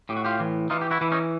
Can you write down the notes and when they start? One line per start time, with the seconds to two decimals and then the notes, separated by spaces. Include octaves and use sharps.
0.09 A2 G4
0.17 F#4
0.25 F4 G4
0.40 E3
0.70 E3 D#4 F4
0.81 G4
0.91 E4 F#4
1.01 E3 E4
1.12 C#4 D#4